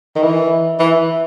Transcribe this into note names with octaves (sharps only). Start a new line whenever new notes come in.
D#3
E3
E3